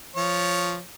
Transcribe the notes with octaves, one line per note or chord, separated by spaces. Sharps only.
F3 C#5